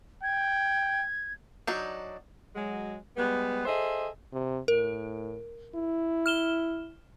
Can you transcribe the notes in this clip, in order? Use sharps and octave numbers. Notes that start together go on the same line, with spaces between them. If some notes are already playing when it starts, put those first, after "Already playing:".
G5 G#6
F#3 D4 D#4
F#3 G#3
G3 G#3 B3
G#4 A4 C5 D#5 E5
C3
A2 A#4
E4
F6 E7 G7